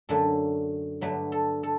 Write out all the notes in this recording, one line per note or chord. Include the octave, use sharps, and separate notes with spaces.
F#2 D3 A3 A4
G2 D3 F#3 A3 B4
A4
A4